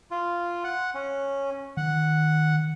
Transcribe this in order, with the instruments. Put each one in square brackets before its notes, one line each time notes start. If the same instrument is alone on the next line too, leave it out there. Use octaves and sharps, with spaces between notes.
[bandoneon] F4
F#5
C#4
[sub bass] D#3 [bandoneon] F#5